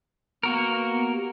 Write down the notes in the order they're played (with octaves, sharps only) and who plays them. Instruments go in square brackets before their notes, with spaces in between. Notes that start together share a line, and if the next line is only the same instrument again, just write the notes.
[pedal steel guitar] A#3 F#4 A#4 [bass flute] B3
[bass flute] G4